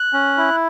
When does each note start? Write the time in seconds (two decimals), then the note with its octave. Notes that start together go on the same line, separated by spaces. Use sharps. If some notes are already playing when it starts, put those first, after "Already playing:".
Already playing: F#6
0.13 C#4
0.38 E4